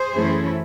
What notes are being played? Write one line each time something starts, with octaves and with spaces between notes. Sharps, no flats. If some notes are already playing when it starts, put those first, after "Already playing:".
Already playing: G#4 C5
F#2 E3 A3 C#4 E4